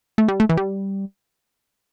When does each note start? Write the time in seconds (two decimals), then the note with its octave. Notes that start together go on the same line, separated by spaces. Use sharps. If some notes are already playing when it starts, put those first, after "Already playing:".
0.18 A3
0.28 G3
0.40 A3
0.49 E3
0.57 G3